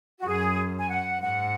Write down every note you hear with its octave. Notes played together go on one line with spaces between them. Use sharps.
F#4
F#2 G#4
G#5
F#5
G#2 F#5